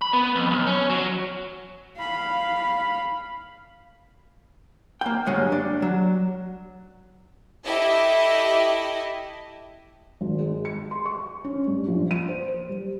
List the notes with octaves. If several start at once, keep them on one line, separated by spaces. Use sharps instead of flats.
B5
B3
F2
B1
C#4
F#3
F5 B5
A#3 G5
D2 G2 F#3 G#3
D4
F#3
E4 G4 A4 D#5 E5
G#1
G#3
C#7
C6
C#6
C#4
G2
A#1
D#7
C5
C5
G3